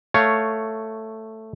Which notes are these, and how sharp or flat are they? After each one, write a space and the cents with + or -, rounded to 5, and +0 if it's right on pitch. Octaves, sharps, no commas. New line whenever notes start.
A3 +5 C#5 +5 F5 +10